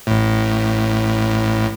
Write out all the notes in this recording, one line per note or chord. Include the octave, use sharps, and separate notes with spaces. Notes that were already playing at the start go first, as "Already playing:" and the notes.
A1 A2